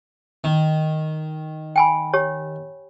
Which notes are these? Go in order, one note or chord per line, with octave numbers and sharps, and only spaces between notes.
D#3
G5 G#5 B5
G4 C#5